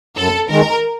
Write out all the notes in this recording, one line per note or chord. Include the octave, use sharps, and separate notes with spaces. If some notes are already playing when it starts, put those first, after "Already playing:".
F#2 A4
D#3 G#3 A#4